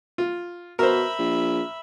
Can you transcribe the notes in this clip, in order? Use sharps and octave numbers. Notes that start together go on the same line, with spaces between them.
F4
B2 A#4 C5 E5 B5
A#1